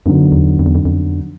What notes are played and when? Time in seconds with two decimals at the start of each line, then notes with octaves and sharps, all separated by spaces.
0.05 F#2 D3 F#3 B3 D#4
0.32 E2
0.59 F2
0.66 E2
0.75 F2
0.85 F2